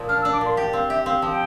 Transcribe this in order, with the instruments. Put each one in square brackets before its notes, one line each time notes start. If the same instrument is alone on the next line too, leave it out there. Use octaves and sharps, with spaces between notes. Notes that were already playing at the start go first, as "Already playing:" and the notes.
Already playing: [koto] A#2 F3 A#3
[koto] D4 [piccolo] F6
[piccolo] E6
[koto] D4
[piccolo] D6
[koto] A#2 [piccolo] C6
[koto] G4 [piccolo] G5
[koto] C4 [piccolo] F5
[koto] G4 [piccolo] E5
[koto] C4 [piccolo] F5
[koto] F3
[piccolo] G5